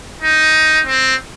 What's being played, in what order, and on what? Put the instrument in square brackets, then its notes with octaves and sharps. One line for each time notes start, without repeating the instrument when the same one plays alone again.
[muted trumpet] D#4
C4